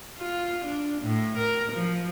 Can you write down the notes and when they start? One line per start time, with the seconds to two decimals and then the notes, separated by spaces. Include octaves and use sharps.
0.18 F4
0.65 D4
1.02 A2
1.38 A#4
1.72 F3